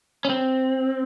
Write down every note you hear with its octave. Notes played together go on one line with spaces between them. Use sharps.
C#4
C4